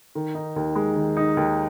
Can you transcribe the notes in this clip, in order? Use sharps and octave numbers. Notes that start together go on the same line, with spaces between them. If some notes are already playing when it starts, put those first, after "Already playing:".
D#3
D#4
D#2
G#3
D#3
D#4
D#2